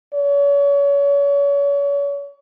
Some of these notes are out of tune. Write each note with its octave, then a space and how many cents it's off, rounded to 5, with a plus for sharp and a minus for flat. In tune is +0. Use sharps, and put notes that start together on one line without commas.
C#5 +35